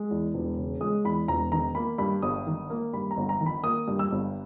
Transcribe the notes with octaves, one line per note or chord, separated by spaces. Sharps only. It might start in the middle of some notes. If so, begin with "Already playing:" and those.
Already playing: G#3
E2
E1
C#3
G#3 D#6
E2 B5
E1 A#5
D#3 A#5
A#3 B5
G2 B5
G1 D#6
D#3
A#3
G2 B5
A#5
G1
A#5
D#3
B5
A#3 D#6
G2
E6
G1